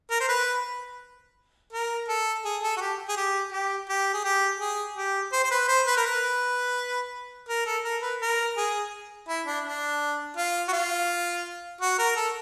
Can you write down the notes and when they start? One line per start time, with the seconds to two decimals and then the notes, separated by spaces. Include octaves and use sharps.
0.10 A#4
0.20 C5
0.29 B4
1.73 A#4
2.08 A4
2.45 G#4
2.63 A4
2.77 F#4
2.81 G4
3.09 G#4
3.17 G4
3.52 G4
3.89 G4
4.14 G#4
4.25 G4
4.60 G#4
4.96 G4
5.33 C5
5.44 C5
5.51 B4
5.68 C5
5.87 B4
5.97 A#4
6.06 B4
7.49 A#4
7.66 A4
7.84 A#4
8.02 B4
8.21 A#4
8.57 G#4
9.29 E4
9.46 D4
9.65 D4
10.37 F4
10.68 F#4
10.73 F4
11.81 F#4
11.99 A#4
12.16 A4